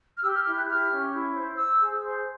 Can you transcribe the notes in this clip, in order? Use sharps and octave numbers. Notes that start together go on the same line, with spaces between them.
F6
G4 E6
F6
E4 F6
F#6
G4 F6
C#4
E4
C5
C5 E6
G#4
C5